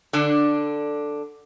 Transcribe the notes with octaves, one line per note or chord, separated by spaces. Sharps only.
D3 D4